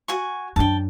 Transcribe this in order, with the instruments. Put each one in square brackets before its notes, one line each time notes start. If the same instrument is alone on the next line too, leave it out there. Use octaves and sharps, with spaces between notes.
[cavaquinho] F#4 G#5 C#6
[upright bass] F#2 D4 [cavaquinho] G5 A5